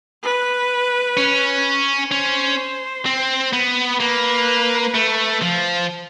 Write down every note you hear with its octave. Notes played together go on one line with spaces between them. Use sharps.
B4
C#4
C#4 C5
C4
B3
A#3 B4
A3
F3